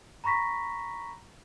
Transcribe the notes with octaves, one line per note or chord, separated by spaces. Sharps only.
A#5 B5 C#6 A#6 B6